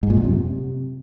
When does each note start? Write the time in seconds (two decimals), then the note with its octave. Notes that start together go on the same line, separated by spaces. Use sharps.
0.03 G#2
0.10 A#2
0.17 F#2
0.24 C3